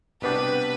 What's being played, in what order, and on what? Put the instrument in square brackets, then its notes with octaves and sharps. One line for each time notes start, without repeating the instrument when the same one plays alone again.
[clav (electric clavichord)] C2 B2 B3 D4 G4 [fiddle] B4